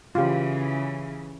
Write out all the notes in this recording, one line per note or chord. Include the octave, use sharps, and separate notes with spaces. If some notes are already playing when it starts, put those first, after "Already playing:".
C#3 E3 F4 G4